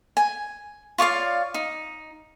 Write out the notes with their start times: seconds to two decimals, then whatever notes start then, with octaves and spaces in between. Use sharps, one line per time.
0.17 G#5
0.98 F4 C#5 D5 F5
1.54 D#4